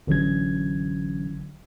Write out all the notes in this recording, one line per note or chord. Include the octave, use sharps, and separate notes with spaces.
A1 D3 E3 F#3 C#4 G#6